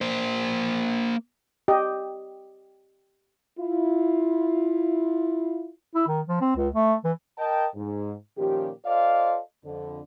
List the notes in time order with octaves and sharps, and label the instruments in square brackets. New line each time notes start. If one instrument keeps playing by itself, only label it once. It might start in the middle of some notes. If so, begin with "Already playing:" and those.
[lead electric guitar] A#3 C5
[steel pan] G4 D#5
[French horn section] E4 F4
[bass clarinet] E4
D#3
F3
C4
C#2
A3
E3
[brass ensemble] A#4 D#5 G5 A5
G#2
A#2 D#3 F3 C#4 G4
F4 A4 C5 D5 D#5 F5
F2 D3